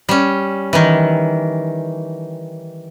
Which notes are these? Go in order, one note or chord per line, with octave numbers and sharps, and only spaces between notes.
G3 C#4
D#3 E3